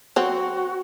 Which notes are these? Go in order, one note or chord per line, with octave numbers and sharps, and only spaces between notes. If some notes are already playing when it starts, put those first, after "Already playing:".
F#3 C4 F#4